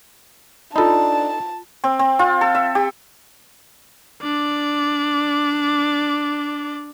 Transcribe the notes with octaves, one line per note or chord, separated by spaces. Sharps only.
D4 D#4 F4 A4 A5 B5
C4
C4
F4
A4
E5
G4
D4 D5